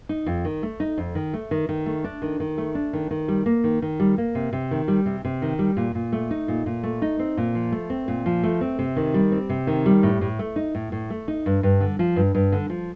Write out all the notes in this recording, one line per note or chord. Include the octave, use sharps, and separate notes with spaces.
D#4
F2
D#3
A3
D#4
F2
D#3
A3
D#3
D#3
A3
D4
D#3
D#3
A3
D4
D#3
D#3
G3
A#3
D#3
D#3
G3
A#3
C3
C3
D#3
G3
C3
C3
D#3
G3
A#2
A#2
A3
D#4
A#2
A#2
A3
D#4
C4
A#2
F3
A3
C4
A#2
F3
A3
C4
C3
D#3
G3
C4
C3
D#3
G3
A2
A2
A3
D#4
A2
A2
A3
D#4
G2
G2
D3
F3
G2
G2
D3
F3